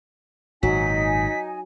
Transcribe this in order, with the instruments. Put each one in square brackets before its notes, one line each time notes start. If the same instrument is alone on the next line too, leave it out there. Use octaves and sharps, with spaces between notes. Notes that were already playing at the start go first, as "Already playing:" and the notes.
[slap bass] G#1 A#2 [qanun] F#3 [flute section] D#4 G#5 [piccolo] B6